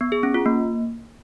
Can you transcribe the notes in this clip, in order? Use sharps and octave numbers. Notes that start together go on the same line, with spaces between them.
B3
G#4
C#4
F4
A#3